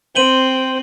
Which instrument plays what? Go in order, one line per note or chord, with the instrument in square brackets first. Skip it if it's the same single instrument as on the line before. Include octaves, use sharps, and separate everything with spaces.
[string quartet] C4 [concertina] C5 G5 [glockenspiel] D#7 F#7 G7